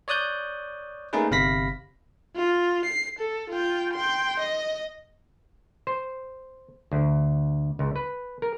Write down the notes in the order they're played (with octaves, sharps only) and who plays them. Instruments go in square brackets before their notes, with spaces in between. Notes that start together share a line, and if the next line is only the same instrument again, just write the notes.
[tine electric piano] C#5 D5 D#6 F#6 G6
A3 A#3 C#4 D#4 G#4 B4
G1 C3 F5 B5 A#6 B6
[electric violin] F4
C7
A4
F4 G5
G5 C6
D#5
[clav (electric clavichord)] C5
D2
C#2
B4
A#4